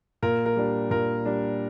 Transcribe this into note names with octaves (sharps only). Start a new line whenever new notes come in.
A#2 A#4
A#4
G3 D4
A#2 A#4
G3 D4